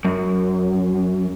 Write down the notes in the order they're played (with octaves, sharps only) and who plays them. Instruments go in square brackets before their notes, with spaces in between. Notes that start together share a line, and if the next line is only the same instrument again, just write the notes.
[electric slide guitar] F#2